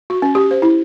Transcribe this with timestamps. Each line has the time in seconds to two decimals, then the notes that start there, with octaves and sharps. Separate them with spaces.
0.10 F#4
0.22 C#4
0.35 G4
0.51 C5
0.62 E4